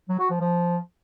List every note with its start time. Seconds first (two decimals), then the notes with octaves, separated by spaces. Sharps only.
0.09 F#3
0.20 F#4
0.30 F3
0.41 F3